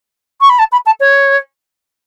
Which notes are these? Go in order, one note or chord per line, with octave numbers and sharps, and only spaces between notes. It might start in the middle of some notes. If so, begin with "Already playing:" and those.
C#6
B5
A5
B5
A5
C#5